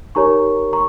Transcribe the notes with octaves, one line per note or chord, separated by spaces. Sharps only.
D#4 G4 A#4 C#5 A#5 C#6
A#5 C#6